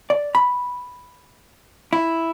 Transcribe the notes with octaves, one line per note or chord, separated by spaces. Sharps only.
D5
B5
E4